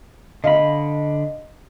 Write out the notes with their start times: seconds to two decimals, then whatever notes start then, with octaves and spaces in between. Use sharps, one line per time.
0.44 D3 D#5 F5 B5